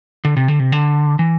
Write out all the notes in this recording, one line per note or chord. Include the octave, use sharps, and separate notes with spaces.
D3
C3
D3
C3
D3
E3